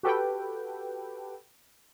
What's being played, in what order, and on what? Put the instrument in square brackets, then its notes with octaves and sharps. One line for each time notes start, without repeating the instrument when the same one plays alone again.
[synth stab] F#4 G4 A4 B4 G5